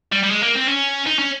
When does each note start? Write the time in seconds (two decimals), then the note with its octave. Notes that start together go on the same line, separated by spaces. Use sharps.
0.12 G3
0.23 G3
0.31 G#3
0.43 A#3
0.56 C4
0.69 C#4
1.07 D#4
1.19 C#4